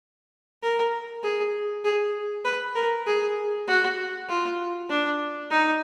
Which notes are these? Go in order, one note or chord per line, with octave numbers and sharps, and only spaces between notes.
A#4
G#4
G#4
B4
A#4
G#4
F#4
F4
D4
D#4